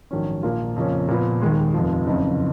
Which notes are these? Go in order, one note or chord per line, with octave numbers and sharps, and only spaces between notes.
A#1 G#2 D#3 F#3 C#4
A#1 A#2 F3 A#3 F4
F2 C#3 F3 A#3 C#4
A#2 F3 B3
D#2 D#3 G#3
F1 F2 F3
F#1 F2 C#3